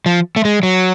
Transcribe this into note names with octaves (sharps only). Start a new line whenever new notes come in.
F3
A3
G#3
F#3